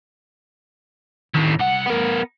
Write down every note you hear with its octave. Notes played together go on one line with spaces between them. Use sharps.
A2 D#3
C2 F#5
B3 A#4